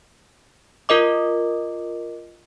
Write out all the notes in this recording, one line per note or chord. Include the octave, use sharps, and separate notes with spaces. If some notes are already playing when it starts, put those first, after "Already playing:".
F4 A#4 D#5 D6